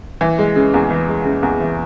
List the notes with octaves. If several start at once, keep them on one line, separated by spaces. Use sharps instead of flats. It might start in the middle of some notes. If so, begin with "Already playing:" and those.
E3
G#3
C#3
E2
E3
G#3
C#3
E2
E3